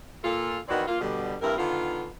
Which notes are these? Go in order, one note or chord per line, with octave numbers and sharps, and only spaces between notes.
A#2 F4 A4
D#3 E3 B3 C4 F#4 D5
A#3 F4
B2 D3 G3
G2 C4 E4 A#4
D3 D#3 B3 F4